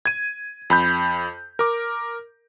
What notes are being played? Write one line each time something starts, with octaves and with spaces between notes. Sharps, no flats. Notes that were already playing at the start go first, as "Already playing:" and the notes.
G#6 D#7
F2 B5 G6
A#4 D6